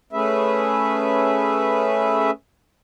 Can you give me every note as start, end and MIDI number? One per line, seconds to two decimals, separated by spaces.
0.13 2.31 57
0.13 2.31 61
0.13 2.31 68
0.13 2.31 71
0.13 2.31 76